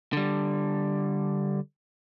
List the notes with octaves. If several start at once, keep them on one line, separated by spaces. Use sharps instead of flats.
D3 G3